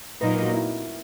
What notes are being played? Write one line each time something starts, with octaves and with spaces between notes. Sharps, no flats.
A#2 F#3 A#3 D#4 B4
A#4
F#4
E4